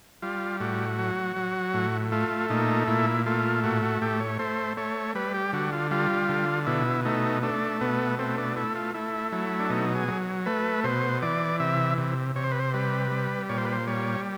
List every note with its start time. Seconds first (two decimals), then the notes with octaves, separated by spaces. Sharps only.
0.22 G3 F4
0.60 A2 F#4
0.99 F#3
1.36 F#3
1.74 A2
2.12 A3 F4
2.50 A#2 D#4
2.88 A#2 E4
3.26 A3 F4
3.64 A2 F#4
3.83 F#4
4.02 A2 G4
4.20 C#5
4.39 A3 C5
4.77 A3 C#5
5.15 G3 B4
5.34 G4
5.53 D3 F#4
5.72 F4
5.91 G3 F4
6.29 D3
6.67 B2 E4
7.05 A3 D#4
7.43 A3 D4
7.81 B2 B3
8.19 A3 C4
8.38 D4
8.56 A3 E4
8.76 F4
8.94 A3 E4
9.32 F#3 E4
9.59 D4
9.70 B2 D#4
9.95 G#4
10.08 F#3
10.46 A3 B4
10.84 B2 C5
11.22 E3 D5
11.60 C3 E5
11.98 C3
12.36 C3 C#5
12.44 C5
12.52 B4
12.60 C5
12.74 G3 B4
13.11 G3
13.49 A#2 C#5
13.58 C5
13.65 B4
13.73 C5
13.87 G3 C#5